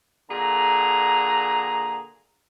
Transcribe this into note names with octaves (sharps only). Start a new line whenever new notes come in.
A#2 D3 G#4 A#5